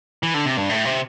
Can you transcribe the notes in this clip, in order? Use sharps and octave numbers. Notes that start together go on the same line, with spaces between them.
E3
D3
C3
G2
A2
C3